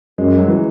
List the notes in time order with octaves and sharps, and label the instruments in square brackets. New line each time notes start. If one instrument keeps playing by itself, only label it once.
[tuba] F#2 [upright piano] G#3
[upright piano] F#3
E3